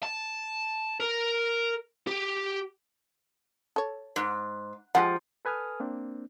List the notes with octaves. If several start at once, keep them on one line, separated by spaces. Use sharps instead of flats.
A5
A#4
G4
A4 C#5
G#2
F3 G#3 G4 F#5
A4 B4 G#5 D#6 F6
A#3 C4 D4